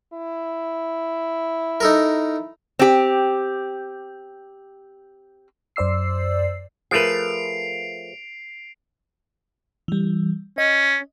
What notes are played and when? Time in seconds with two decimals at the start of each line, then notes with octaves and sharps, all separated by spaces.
0.13 E4
1.80 D#4 A4 A#4
2.79 C4 G4
5.76 F#2 C5 D5 E6 C7
6.91 F3 A3 G#4 A#4 B4 C7 D7 F7
9.88 E3 G3
10.58 C#4 D#5